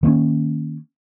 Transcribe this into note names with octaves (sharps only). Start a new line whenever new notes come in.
D#3 A#3 C4 C#4